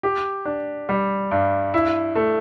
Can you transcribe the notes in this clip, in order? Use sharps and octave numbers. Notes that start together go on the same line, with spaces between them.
G4
D4
G3
G2
E4
A3